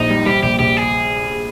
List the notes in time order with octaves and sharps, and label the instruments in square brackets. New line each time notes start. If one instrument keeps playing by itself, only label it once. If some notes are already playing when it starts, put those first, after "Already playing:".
Already playing: [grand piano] A#1 [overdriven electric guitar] D#4
[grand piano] G3
[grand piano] G3 [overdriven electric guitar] G4
[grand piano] A#1 [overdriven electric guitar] G4
[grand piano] A#1 [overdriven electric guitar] G4
[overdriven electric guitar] G#4